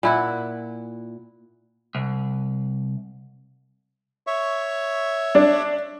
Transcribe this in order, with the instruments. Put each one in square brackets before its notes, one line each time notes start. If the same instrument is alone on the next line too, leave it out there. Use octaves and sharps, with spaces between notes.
[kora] A#2 E4 F#5
[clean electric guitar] C2
[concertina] C#5 E5 C#6
[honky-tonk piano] D4